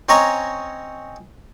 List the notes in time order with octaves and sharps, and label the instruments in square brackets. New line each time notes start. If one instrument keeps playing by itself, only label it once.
[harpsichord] C4 C#4 C#5 D#5 A#5 C#6